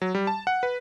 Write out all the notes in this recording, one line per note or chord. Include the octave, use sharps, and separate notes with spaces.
F#3
G3
A5
F#5
B4